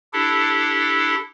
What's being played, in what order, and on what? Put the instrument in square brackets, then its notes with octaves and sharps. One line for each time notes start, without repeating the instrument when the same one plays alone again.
[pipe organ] D4 E4 G4 A4